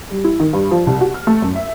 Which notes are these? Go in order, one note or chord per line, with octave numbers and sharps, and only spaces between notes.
G3
E4
D#3
G2
F3
C2
F#4
F6
A3
F#2
E5